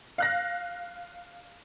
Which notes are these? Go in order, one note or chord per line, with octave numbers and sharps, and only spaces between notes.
F5 F#6 A#6